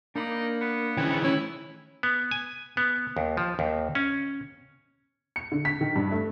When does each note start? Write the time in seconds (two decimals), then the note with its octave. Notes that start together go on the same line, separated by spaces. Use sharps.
0.16 A#3 D4 D#4 B5 D6
0.61 B3
0.97 D#3 E3 C#4 G#4 C5 G5
1.24 A3 C#4 E4
2.03 B3
2.31 G#5
2.77 B3
3.17 D#2
3.37 F3
3.59 D#2
3.95 C#4
5.36 C#7
5.52 D3
5.65 B6
5.81 D#3
5.96 G2
6.11 A3